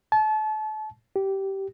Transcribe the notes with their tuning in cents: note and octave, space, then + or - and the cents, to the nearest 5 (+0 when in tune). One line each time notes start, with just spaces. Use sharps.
A5 -30
G4 -15